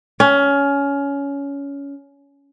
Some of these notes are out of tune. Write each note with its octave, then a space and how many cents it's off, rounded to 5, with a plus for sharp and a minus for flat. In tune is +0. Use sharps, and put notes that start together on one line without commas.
C#4 +20